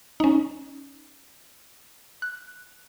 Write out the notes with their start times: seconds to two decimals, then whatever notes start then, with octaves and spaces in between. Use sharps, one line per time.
0.20 C#4 D#4
2.22 F#6